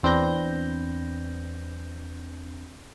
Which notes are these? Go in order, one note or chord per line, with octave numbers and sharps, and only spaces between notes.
E2 C4 D4 B4 G6 A#6